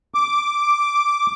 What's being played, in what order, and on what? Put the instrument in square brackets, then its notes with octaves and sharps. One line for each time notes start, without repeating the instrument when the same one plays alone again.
[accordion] D6